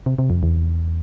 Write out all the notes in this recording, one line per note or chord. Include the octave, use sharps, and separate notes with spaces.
C3
C3
F2
E2